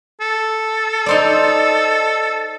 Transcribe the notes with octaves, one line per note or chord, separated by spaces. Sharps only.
A4
D#4 C5 D5